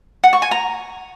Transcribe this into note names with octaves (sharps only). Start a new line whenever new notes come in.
F#5
C#6
G#5
A#5